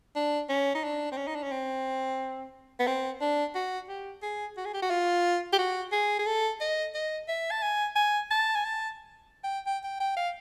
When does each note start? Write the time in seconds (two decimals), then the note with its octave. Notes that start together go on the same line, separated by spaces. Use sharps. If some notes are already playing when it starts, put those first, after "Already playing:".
0.15 D4
0.49 C#4
0.75 D#4
0.84 D4
1.12 C4
1.17 C#4
1.27 D#4
1.35 D4
1.43 C#4
1.51 C4
2.80 B3
2.87 C4
3.21 D4
3.55 F#4
3.89 G4
4.22 G#4
4.57 F#4
4.65 G#4
4.74 G4
4.82 F#4
4.90 F4
5.53 G4
5.58 F#4
5.92 G#4
6.19 G#4
6.26 A4
6.61 D#5
6.94 D#5
7.28 E5
7.51 A5
7.62 G#5
7.96 G#5
8.31 A5
8.55 G#5
8.64 A5
9.44 G5
9.66 G5
9.83 G5
10.00 G5
10.17 F5